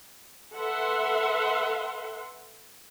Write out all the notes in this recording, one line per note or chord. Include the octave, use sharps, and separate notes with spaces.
A4 B4 E5 F#5 C6